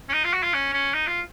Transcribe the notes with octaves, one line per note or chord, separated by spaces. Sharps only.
C#4
D#4
F4
F#4
F4
C#4
C#4
D#4
F4